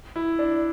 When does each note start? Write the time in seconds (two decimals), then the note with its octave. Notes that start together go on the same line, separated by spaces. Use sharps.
0.16 E4
0.39 D4